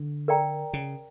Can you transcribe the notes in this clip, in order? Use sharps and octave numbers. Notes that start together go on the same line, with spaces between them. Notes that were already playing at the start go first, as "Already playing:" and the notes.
Already playing: D3
A#4 D5 G5 A#5
C#3